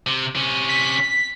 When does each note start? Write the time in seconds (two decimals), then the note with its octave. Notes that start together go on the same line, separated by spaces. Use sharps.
0.07 C3
0.35 C3 C#4
0.69 B6